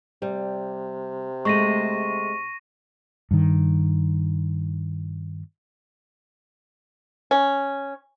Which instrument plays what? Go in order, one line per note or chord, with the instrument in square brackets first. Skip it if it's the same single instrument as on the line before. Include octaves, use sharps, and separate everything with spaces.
[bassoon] C3 [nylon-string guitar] G3
[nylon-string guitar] G#3 A3 [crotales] C#6 A#6 D#7
[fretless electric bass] G2 D#3
[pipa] C#4